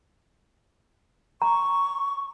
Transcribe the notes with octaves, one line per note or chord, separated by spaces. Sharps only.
A#5 C#6